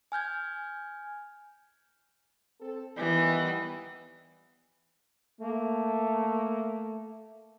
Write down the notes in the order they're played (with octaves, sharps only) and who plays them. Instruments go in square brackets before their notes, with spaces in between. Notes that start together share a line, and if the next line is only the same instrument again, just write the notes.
[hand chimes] G#5 F6 G6 G#6
[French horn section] C4 A4
[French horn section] D#3 G3 B3 [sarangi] E3
[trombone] A3 [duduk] A#3